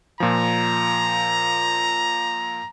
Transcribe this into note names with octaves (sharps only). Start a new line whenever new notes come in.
A#2 F3 A#5